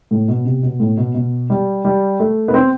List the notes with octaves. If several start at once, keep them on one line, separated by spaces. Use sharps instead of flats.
A2
B2
C3
B2
A2
B2
B2
G3
G3
A3
B3
C4